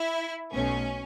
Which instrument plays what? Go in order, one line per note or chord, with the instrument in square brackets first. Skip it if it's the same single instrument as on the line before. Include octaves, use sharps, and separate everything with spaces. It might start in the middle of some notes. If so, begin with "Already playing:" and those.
Already playing: [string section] E4
B1 B2 A3 C#4